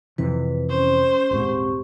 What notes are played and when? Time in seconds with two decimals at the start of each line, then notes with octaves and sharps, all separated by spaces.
0.18 F2 C3 E3 B4
0.70 C#4 C5
1.31 D#1 G#2 C4 G4 C#6